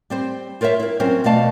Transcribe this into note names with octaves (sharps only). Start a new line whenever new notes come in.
G3 C4 C5
F4 A#4 C5 C#5 E5
E4 A#4
F#3 C4 C#4 F4 A#4 C5
E2 B2 A3 D5 F5 A5